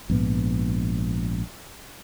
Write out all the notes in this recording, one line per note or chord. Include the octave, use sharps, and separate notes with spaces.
A#1 G#2 B3